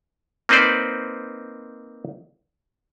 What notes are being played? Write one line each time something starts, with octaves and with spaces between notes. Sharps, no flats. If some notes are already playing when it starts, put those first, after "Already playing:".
A#3 C4 D#4 B4 C5 D5